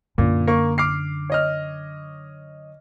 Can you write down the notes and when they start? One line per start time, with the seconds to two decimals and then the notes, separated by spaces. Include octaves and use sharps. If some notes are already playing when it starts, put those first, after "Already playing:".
0.18 F#2 A#2 D3
0.48 A#3 C#6
0.78 D6 F6 C7
1.30 C#5 D#5 F6